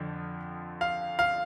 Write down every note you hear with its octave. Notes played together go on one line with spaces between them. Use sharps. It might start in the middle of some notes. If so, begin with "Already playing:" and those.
Already playing: F2 D3 F3
F5
F5